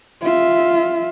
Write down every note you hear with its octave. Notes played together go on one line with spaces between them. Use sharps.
F4 E5